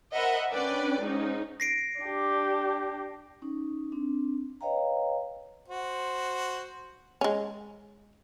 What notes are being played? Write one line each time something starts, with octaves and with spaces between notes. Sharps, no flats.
A#4 C5 D#5 E5 F#5 B5
C#4 D4 B4 D5 G5
G#2 C#4 D#4
A#6 C7 D7
D4 G4
C#4 D#4
C4 D4
B4 C#5 D#5 F5 G5 A#5
F#4 C5
G#3 C#4